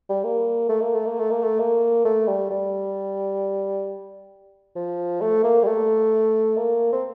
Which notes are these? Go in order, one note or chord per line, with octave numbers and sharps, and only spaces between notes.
G3
A#3
A3
A#3
A3
A#3
A3
A#3
A3
A#3
A3
G3
G3
F3
A3
A#3
G3
A3
A#3
C4